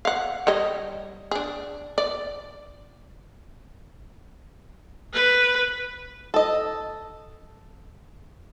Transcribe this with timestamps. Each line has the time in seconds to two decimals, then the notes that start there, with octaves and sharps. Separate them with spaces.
0.05 F5 F#5
0.47 G3 C#5 D#5
1.31 D4 G#4
1.98 D5
5.14 B4
6.34 A4 D#5